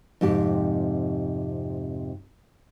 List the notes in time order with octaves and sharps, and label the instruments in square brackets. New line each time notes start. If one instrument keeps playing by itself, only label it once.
[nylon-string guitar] F2 G#2 C3 G4